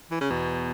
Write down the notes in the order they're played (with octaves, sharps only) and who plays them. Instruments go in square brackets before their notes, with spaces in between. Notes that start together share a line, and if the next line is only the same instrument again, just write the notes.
[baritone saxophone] E3
C#3
[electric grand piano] E2 [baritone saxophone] B2